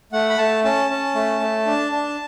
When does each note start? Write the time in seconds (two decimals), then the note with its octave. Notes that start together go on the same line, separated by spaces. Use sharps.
0.13 A3 F#5
0.29 B5
0.38 A3 A5
0.64 C#4 A5
0.90 C#4
1.15 A3
1.41 A3
1.66 D4
1.92 D4